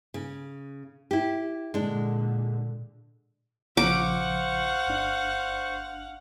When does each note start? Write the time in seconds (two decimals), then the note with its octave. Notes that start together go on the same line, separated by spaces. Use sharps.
0.14 C#3
1.11 E4 G4
1.74 A#2 D3 G#3 D4
3.77 A#1 C#3 F3 C5 F5 F#5 C#6 D6
4.87 G1 D4